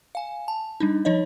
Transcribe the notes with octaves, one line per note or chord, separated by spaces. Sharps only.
F5 G#5
A5
G3 D4 D#4
F3 D#4 C#5 D#5